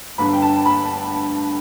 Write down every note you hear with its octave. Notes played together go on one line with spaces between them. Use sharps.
G1 G2 D3 B5
G5
A5
B5